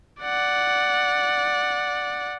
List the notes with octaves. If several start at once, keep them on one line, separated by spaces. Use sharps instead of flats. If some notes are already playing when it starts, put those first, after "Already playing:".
D5 F#5